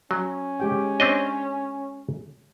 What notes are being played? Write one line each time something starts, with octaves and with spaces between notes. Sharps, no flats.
F#3 C#4
G#3 G4 G5
C4 D4 C#5 D#5